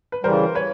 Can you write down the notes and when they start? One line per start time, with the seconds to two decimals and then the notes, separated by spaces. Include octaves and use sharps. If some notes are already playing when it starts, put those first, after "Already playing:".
0.12 B4
0.23 C#3 E3 G3 A#4 C5
0.55 B4 C#5